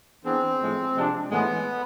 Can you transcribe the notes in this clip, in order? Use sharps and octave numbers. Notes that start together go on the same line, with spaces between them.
E3 B3 C4 D4 G#4
A2 F3 G#3
C3 F3 G#3 D4
A2 E3 G#3 B3